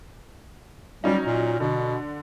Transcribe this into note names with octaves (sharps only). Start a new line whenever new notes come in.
F#3 G3 C#4 D#4
A#2
B2 D3